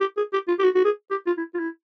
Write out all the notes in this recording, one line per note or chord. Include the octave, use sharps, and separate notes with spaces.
G4
G#4
G4
F4
G4
F#4
F#4
G#4
G4
F4
E4
F4
E4